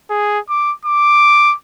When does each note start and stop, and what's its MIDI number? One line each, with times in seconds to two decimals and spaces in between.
0.10 0.39 68
0.49 0.73 86
0.85 1.55 86